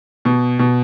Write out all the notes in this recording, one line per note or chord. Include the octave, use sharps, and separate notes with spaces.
B2
B2